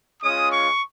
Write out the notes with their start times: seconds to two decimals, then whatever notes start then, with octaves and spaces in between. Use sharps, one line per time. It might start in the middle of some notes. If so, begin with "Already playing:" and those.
0.22 G#3 C#4 F4 D#6
0.51 C#6